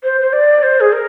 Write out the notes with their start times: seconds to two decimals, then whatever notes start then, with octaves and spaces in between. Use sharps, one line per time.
0.04 C5
0.21 C5
0.33 D5
0.63 C5
0.81 G#4
0.93 A#4